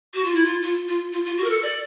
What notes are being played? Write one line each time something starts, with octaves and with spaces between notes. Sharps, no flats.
F#4
F4
E4
F4
F4
F4
F4
F4
F#4
A#4
A4
D5